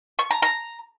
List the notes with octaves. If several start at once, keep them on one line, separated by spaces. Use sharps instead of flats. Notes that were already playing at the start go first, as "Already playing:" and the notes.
C#6
A#5
A#5